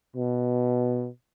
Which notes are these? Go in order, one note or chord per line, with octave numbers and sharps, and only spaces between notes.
B2